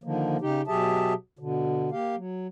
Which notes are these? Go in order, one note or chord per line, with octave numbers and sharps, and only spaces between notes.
D3 D#3 F3 A#3
C#3 D#4 G4
B2 F#3 G4 G#4 E5 A5
B2 D3
A#3 G4 F5
F#3